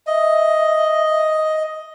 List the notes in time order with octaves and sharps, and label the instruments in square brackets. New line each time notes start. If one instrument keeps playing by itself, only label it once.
[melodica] D#5 [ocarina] E5